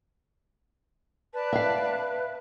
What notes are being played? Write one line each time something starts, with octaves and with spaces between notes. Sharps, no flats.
B4 D5 A5
E5 F5